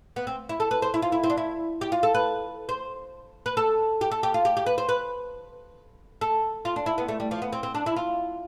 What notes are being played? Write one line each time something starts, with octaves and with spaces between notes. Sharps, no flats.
B3
C4
E4
A4
B4
C5
E4
F4
E4
C4
D4
E4
G4
F4
A4
B4
C5
B4
A4
G4
A4
G4
F4
G4
G4
B4
C5
B4
A4
F4
D4
E4
B3
A3
G3
F3
B3
C4
C4
D4
E4
F4